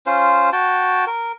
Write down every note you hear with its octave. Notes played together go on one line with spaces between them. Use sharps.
C#4 F4 C5
F#4 G5 A5
A#4